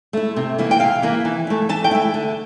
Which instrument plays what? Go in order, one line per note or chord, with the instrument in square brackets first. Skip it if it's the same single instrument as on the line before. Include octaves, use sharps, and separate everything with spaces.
[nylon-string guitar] A3 E4
C3
E3 A#3 E4
G5
C3 F5
E3 A#3 E4
E3
A3 E4
E3 A5
G5
A3 E4
D3